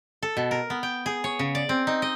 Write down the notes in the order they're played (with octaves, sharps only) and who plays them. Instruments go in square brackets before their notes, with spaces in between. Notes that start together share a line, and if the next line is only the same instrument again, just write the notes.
[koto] A4
B2
A#4
B3
G5
G#4
C#5
C#3
D5
C4
D#4
D#5